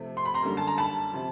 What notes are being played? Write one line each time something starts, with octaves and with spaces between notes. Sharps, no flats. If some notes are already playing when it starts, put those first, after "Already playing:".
Already playing: C3 F3 A3
C6
B5
A#5 C6
F#2 D3 G3 A#3
A5
A#5
A5 B5
C3 F3